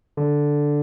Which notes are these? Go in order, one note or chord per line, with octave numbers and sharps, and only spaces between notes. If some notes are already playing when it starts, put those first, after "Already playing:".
D3